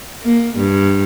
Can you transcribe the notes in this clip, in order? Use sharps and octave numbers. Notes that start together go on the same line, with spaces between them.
A#3
G2